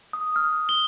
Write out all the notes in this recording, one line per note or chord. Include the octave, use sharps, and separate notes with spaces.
D#6
F6
G7